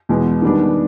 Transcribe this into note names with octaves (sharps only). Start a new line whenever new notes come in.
E2 B2 G#3 B3
D#3 G3 B3 D4